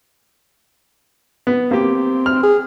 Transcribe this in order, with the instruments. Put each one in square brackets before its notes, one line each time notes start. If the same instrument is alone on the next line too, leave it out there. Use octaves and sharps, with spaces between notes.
[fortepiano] B3
[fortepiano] A#3 G4 [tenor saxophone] C4
[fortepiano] F6
[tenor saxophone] G#4